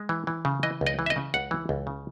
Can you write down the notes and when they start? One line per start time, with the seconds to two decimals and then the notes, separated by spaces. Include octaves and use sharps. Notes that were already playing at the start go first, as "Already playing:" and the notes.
Already playing: G#3
0.09 E3
0.27 E3
0.45 C#3
0.63 E3 D#5
0.81 C#2
0.86 D#5
0.99 E3
1.06 E5
1.10 D#5
1.16 C#3
1.34 C#2 F#5
1.51 E3
1.69 C#2
1.87 C#3